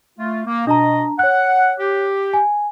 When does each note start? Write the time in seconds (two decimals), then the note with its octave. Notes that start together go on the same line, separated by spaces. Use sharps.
0.19 A3 F4
0.47 A#3
0.67 B2 D4 D#5 A5 A#5
1.19 C#5 F#5 F#6
1.80 G4
2.34 G#5